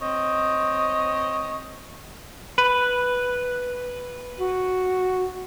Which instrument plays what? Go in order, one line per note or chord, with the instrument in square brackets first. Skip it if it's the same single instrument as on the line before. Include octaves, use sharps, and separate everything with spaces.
[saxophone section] C4 C#5 D#5
[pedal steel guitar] B4
[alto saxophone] F#4